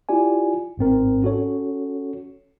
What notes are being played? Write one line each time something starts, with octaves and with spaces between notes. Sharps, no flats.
E4 F4 G4 D5 G#5
G#1 G#2 C4 A#4
C#4 F#4 A4 C#5